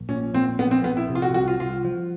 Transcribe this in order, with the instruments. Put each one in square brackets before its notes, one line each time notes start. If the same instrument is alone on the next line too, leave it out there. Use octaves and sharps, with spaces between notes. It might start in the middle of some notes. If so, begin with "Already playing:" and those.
Already playing: [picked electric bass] A#1
[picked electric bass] A#2 [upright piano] C#4
[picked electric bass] A#1 [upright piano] C4
[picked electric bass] A#1 [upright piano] B3
[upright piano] C4
[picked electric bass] A#1 [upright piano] B3
[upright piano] E4
[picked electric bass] C3
[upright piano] F4
F#4
[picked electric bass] C2 [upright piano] F#4
[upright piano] F4
[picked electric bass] C2 [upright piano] F4
[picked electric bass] F3